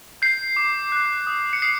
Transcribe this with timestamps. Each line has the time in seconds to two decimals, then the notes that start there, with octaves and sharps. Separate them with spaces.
0.22 G6 C7
0.56 D6
0.92 F#6
1.27 D#6
1.53 C#7
1.62 D#6 C7